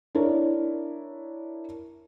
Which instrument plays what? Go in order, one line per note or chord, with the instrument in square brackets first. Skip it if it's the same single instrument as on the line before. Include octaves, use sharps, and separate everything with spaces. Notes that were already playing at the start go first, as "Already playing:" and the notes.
[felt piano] D4 E4 A#4 C#5